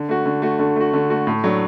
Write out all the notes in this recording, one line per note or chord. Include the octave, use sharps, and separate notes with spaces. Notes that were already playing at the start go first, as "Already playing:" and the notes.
Already playing: D3
A3 F#4
D3
A3 F#4
D3
A3 F#4
D3
A3 F#4
A2
F#3 D4 A4